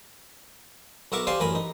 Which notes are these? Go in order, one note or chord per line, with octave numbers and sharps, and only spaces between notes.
B1 F#4 A#4 E5 C#6 D6
G4 C5 D5 F5 G#5
A1 F#2 A#4 G#5 B5
D#4